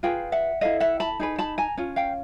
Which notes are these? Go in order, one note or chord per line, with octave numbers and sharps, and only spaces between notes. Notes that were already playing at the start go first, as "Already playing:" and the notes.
F4 G#4 B4 F5 G5
E5 F#5
E4 A4 D#5 F5
E5 F#5
A5 B5
D#4 G#4 B4
A5 B5
G#5 A#5
C#4 F4
F5 G5